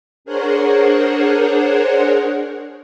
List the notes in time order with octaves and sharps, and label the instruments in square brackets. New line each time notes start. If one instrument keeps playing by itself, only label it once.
[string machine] D4 G#4 A#4 C5 C#5 F#5